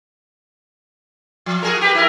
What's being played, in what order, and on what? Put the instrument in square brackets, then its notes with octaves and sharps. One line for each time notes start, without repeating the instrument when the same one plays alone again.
[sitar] F3
F#4 G#4 A#4
G4 B4
E4 A#4